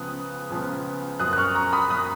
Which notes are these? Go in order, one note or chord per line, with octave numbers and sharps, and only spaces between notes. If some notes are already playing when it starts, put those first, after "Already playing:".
Already playing: C#2 C#3 F3 B3 D#6 F#6
C#2 C#3 F3 B3
F#2 F3 A#3 D#6 F#6
F#6
C#6 F6
A#5 C#6
B5 D#6
F3 A#3 D#6 F#6